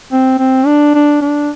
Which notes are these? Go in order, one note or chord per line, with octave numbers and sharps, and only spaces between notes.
C4
C4
D4
D4
D4